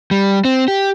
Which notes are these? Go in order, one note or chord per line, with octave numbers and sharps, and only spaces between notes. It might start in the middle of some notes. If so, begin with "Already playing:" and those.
G3
C4
G4